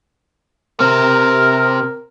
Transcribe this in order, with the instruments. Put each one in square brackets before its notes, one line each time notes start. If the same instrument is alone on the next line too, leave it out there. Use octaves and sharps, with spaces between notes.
[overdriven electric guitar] C3 C4 [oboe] A#4